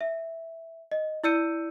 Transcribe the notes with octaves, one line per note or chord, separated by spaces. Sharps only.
E5
D#5
E4 D5 E6 G6 C#7 D#7